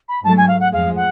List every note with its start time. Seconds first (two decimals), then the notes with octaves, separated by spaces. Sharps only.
0.08 B5
0.24 G#2 F#3 A3 A5
0.37 G#5
0.48 F5
0.60 F#5
0.72 F2 F3 G#3 F5
0.95 F#5